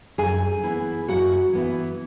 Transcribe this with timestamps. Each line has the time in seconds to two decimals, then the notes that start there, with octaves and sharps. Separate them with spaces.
0.18 F#2 G#4 G#5
0.63 E3 B3 E4
1.08 F#2 F#4 F#5
1.53 E3 B3 E4